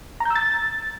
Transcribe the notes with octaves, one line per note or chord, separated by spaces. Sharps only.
A#5
G6
E6
A6